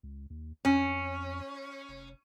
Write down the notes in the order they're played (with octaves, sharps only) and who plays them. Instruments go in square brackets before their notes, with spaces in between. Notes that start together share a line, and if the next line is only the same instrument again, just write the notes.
[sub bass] C#2
D#2
[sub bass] F2 [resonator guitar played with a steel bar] C#4
[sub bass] F1